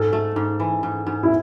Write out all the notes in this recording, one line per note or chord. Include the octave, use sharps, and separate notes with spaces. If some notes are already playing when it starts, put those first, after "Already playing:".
Already playing: G#2 A4
A3
G#2
E3
G#2
G#2
E4